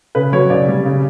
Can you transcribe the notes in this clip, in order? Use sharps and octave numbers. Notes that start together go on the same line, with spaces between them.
C#3 B4
F#3 C#5
C#3 D5
G3
C#3